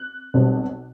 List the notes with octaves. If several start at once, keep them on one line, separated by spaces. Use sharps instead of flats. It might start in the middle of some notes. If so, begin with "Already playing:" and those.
Already playing: F#6
B1 B2 G3 C4